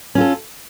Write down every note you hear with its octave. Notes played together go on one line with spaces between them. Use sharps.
C#4 F4 A4